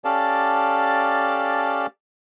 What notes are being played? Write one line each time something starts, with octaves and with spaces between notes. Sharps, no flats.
C#4 G4 A4 D5 F5 A5